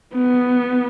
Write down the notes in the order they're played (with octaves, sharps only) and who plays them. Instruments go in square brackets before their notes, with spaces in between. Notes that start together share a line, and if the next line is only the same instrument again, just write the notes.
[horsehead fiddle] B3